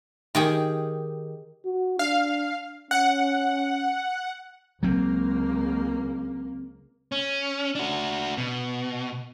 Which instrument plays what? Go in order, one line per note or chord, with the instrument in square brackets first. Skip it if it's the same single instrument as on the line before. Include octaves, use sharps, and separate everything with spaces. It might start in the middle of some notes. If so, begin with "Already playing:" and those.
[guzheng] D#3 G4 G#4
[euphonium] F#4
[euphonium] D4 [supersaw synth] F5
[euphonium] C#4 [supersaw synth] F#5
[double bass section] C#2 A#3 [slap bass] F#3 C4
[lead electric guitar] C#4
D4 F#4
B2